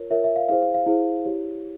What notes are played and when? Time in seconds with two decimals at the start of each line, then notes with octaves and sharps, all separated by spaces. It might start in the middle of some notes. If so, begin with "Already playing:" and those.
Already playing: F4 A#4 C#5
0.10 F4 A#4 C#5 E5
0.24 E5
0.36 F5
0.49 E4 G#4 C5 F5
0.62 F5
0.74 F5
0.87 E4 G#4 C5
1.25 E4 G4 C#5